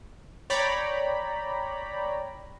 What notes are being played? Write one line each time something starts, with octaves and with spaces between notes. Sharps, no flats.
C#5 D5 G5 A#5 B5